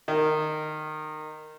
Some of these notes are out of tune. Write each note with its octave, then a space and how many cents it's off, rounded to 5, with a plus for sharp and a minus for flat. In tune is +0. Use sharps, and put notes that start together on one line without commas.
D#3 -15